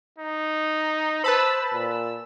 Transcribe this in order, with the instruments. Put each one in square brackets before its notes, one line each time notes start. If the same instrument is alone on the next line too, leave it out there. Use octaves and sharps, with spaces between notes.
[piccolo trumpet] D#4
[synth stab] B4 A5 B5 [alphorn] C5 [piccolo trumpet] E6
[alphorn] A#2 [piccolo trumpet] E6